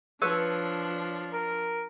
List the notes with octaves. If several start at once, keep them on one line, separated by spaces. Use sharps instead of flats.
F3 D4 B4 C#5 E6
A#4